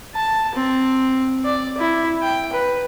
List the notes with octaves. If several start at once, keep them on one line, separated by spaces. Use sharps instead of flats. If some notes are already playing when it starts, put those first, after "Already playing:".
A5
C4
D5
E4
G5
B4